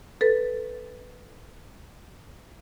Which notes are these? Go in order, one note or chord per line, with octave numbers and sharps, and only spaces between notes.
A4 B4 A6